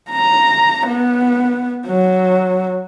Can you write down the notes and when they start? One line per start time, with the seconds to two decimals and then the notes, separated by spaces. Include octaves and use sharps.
0.10 A#5
0.87 B3
1.87 F#3